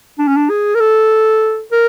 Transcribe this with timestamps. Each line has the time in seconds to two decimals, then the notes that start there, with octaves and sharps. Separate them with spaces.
0.19 D4
0.28 C#4
0.37 D4
0.50 G#4
0.75 A#4
0.80 A4
1.72 A#4